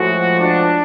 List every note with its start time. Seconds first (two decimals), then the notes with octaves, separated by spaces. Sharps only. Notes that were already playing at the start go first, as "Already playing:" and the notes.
Already playing: A2 F3 G#3 F#4
0.40 D4